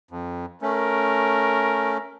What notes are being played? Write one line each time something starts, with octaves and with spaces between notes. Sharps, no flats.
F2
A3 C#4 A#4